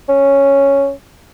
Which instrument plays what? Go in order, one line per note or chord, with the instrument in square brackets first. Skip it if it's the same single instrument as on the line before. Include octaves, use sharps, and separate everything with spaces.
[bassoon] C#4